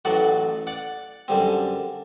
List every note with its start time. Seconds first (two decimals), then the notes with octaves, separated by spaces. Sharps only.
0.05 A1 A2 F#3 D5 F#5
0.67 D5 F#5
1.28 F#2 D3 G3 C4